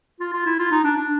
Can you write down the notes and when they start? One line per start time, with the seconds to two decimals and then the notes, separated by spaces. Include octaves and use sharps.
0.20 F4
0.33 F4
0.46 E4
0.59 F4
0.71 D#4
0.84 D4
0.96 D4